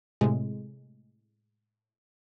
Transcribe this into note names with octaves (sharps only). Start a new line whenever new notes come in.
A2 C3 G#3